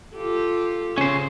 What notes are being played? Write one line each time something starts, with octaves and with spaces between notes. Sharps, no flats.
F4 G4 A4
C#3 C#4 C5